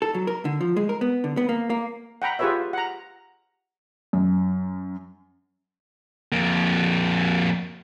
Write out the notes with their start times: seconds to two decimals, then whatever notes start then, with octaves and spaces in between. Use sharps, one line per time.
0.02 A4
0.14 F#3
0.27 A#4
0.45 D3
0.61 F3
0.76 G#3
0.89 A#4
1.01 B3
1.24 D3
1.37 B3
1.49 A#3
1.70 A#3
2.22 F#5 G5 A#5 B5
2.39 F4 G4 G#4 B4 C#5 E5
2.73 F#5 A#5
4.13 F#2
6.32 F2 A#3